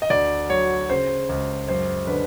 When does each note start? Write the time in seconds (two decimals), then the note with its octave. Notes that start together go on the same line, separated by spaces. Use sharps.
0.02 D#5
0.10 D2 D5
0.49 F#3 C#5
0.90 C#3 C5
1.29 C#2
1.68 F#2 C5
2.07 D3 B4